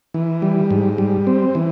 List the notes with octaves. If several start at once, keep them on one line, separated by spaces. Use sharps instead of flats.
E3
G3
G#2
G3
C4
E3